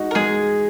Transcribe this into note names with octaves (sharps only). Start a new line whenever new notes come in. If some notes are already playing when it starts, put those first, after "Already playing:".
Already playing: G#3 D#4 F#4
A#4
G#3 G#4